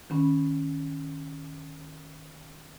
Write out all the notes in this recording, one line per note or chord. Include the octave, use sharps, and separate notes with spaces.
D#3 C#4 B5